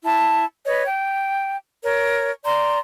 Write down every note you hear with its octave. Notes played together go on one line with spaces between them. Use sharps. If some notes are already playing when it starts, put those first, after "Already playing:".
E4 A5
B4 C#5 D#5
G5
A#4 C#5
D5 A#5 C6